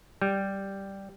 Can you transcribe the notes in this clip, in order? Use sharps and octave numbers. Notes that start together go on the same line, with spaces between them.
G3